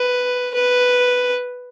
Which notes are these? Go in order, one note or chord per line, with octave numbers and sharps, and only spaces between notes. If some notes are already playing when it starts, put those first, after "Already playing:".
Already playing: B4
B4